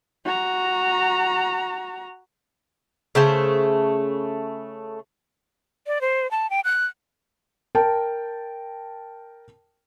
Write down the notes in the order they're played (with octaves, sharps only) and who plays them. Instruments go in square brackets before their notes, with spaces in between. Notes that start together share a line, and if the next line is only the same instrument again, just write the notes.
[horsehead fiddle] F#4 A#5
[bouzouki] C#3 A3 C5 A5
[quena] D5
C5
A5
G5
F#6
[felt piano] A#4 G5 A5